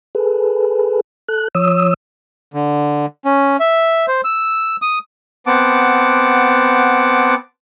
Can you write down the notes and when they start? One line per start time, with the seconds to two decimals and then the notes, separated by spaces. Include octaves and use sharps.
0.15 G#4 A4 B4
1.28 A4 F#6
1.55 F3 C#5 D#6 E6
2.54 D3
3.25 C#4
3.60 E5
4.08 C5
4.24 E6
4.82 D#6
5.47 B3 C4 F#5 A5 D6